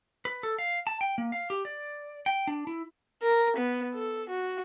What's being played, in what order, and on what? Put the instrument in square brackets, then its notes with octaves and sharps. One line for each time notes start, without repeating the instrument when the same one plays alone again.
[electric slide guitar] B4
A4
F5
A5
G5
A#3
F5
G4
D5
G5
D4
E4
[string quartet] A#4
B3
A4
F#4